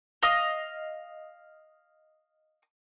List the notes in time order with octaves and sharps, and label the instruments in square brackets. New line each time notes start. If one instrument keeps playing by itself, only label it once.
[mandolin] D#5 F5 D#6